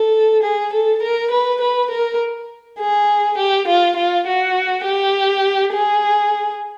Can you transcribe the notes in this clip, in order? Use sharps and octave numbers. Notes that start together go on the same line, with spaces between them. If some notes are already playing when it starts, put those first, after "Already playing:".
Already playing: A4
G#4
A4
A#4
B4
B4
A#4
G#4
G4
F4
F4
F#4
G4
G#4